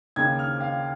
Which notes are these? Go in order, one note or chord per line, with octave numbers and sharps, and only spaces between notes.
D#2 C#3 A#3 G#6
F6
F5